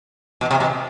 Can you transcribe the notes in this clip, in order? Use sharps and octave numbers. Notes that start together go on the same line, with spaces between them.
B2
C3
B2